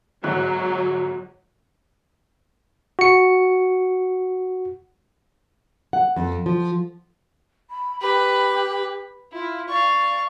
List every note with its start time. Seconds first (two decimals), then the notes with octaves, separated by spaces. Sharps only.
0.24 G1 G#2 F#3 F#6
2.99 F#4 C#7
5.93 F#5
6.16 F2
6.46 F3
7.70 B5
8.01 G4 B4 B5
9.33 E4 F4
9.69 D5 F5 C#6